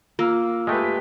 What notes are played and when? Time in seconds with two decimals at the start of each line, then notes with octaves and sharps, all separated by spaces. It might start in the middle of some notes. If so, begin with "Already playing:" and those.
0.19 A#3 F4 E6 F6
0.67 G#3 A3 G4 B4